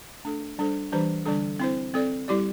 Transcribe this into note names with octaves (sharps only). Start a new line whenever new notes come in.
A3 D4 A4
G3 D4 A4 C5
E3 G3 D4 G4 C5
D3 G3 D4 A4
C4 E4 C5
C4 A4 D5
G3 E4 G4 D5